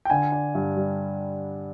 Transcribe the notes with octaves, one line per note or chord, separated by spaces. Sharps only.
G5
D3 G#5
D4
G2
G3